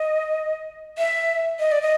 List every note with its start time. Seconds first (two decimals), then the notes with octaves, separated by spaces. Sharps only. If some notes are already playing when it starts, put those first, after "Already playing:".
Already playing: D#5
0.98 E5
1.59 D#5
1.72 D5
1.82 D#5